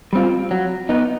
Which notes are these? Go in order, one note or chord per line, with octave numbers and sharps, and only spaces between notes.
G3 C4 F4
F#3
B3 D#4